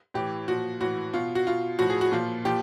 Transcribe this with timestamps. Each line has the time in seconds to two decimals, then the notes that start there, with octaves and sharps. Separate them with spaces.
0.14 A2 E3 G4
0.48 A#2 F3 F#4
0.81 A2 E3 F#4
1.13 B2 F4
1.35 F#4
1.47 B2 F4
1.79 A2 F3 F#4
1.90 G#4
2.01 F#4
2.12 A#2 F3 F4
2.45 A#2 F3 G4